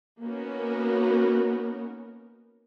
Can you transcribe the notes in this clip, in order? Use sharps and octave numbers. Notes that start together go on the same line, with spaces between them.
A#3 B3 C#4 D#4 F#4 A#4